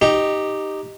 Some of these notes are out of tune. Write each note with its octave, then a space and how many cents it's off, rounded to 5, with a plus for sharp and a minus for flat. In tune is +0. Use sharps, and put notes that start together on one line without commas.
D#4 -5 G4 +0